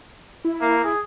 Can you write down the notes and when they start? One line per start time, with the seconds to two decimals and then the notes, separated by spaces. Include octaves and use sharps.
0.45 E4
0.61 A#3
0.84 G#4